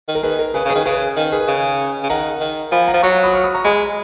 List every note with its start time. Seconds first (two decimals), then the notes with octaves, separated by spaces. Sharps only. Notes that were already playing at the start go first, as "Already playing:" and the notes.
0.08 D#3
0.15 A#4
0.23 D#3 G#4 B4
0.39 A#4
0.54 C#3 G#4 B4
0.65 C#3
0.70 G#4 B4
0.76 D#3
0.85 C#3 G#4 B4
1.16 D#3
1.32 G#4 B4
1.48 C#3
2.03 C#3
2.09 D#3 F#5 A#5
2.41 D#3
2.71 F3 G#5 B5
2.87 F#5 A#5
2.94 F3
3.03 F#3 A#5 C#6
3.23 B5 D#6
3.33 C#6 F6
3.44 B5 D#6
3.54 A#5 C#6
3.64 G#3 G#5 B5